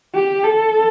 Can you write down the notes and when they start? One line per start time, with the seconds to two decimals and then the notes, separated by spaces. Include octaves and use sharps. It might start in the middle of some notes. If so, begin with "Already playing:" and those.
0.15 G4
0.44 A4